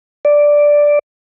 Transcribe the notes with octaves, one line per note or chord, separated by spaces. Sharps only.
D5